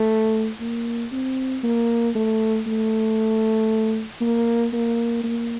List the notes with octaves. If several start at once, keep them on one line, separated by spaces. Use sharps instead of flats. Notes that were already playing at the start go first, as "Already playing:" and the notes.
Already playing: A3
A#3
C4
A#3
A3
A3
A#3
A#3
A#3